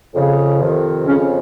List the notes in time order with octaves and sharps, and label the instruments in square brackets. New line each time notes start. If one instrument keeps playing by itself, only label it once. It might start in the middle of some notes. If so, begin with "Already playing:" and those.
[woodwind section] F2 C#3
F2 C3 D#3
F2 C#3 C#4